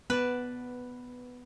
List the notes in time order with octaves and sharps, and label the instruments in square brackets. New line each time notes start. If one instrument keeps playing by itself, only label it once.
[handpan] B3 [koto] B4 D5 A5